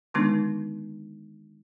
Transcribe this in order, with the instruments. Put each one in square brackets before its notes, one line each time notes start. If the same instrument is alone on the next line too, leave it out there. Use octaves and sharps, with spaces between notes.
[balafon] D3 D#3 G#3 B3 D4 D#4